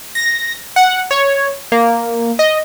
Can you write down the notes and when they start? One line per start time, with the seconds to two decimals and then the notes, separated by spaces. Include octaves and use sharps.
0.15 A#6
0.76 F#5
1.11 C#5
1.72 A#3
2.39 D#5